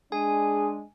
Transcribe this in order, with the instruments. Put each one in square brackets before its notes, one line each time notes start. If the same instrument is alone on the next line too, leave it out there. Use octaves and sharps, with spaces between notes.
[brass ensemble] G#3 D4 [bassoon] G#4 [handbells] G#5